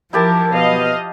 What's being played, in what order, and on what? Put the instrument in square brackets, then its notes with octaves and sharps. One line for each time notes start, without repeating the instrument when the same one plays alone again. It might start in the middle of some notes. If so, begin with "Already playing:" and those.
[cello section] F3 [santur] E4 G4 A5 [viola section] A#4
[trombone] B2 [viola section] D#5 F5